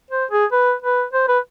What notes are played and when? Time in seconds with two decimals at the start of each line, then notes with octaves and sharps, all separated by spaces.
0.10 C5
0.31 G#4
0.52 B4
0.82 B4
1.13 C5
1.28 B4